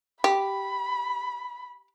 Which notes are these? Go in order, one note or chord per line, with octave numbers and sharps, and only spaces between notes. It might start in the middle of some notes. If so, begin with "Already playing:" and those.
G4 B5